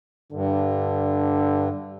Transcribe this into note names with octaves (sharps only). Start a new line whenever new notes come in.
G2 D3